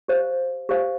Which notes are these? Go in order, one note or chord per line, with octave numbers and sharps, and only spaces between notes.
G4 C5 F5
G4 C5 F5